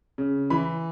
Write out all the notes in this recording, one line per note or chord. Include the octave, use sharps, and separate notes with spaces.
C#3
E3 B5